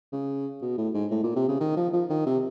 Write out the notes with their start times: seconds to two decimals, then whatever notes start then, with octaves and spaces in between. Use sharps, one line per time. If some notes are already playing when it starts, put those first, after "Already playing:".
0.13 C#3
0.62 B2
0.78 A2
0.94 G#2
1.11 A2
1.23 A#2
1.36 C3
1.48 C#3
1.61 D#3
1.77 F3
1.93 F3
2.10 D#3
2.26 C3